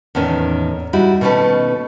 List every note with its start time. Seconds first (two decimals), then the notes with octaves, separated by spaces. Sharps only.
0.15 E2 A2 D#3 C#4
0.93 G3 D#4 E4 F#4
1.21 B2 D#3 A3 A#3 C#4 B4